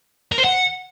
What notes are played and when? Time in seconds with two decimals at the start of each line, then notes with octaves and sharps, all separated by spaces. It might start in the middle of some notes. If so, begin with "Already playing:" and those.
0.32 A#4
0.38 C5
0.44 F#5